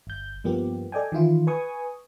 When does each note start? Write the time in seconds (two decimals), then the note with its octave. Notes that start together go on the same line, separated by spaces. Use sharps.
0.07 G1 G6
0.44 G2 F3 A#3 B3 G4
0.92 A4 D5 D#5 G5 G#5
1.12 D#3 E3 E4 F4
1.47 B4 G#5 C#6 D#6